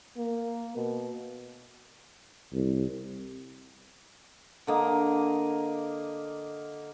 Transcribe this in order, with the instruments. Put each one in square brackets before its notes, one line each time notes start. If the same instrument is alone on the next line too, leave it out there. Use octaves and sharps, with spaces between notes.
[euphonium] A#3
B2
[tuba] C2
[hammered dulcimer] D3 A#3 D#5